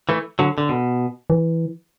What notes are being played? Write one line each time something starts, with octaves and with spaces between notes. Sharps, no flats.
E3 A3
D3 F#3
D3
B2
E3